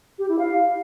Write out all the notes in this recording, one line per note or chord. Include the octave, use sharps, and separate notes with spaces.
G4
E4
F5